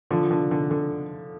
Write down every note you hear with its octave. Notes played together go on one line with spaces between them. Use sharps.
D3 F3
D3
D3
D3